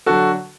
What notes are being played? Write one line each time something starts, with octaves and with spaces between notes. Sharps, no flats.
D3 F#3 F#4 A4